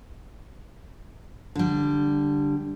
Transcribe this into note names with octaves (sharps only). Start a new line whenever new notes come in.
D3 G3